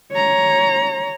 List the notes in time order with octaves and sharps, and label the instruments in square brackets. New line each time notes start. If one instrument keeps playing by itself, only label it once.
[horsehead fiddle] C#5 A#5